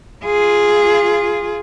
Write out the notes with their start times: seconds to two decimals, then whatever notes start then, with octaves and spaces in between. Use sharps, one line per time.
0.25 F4 G#4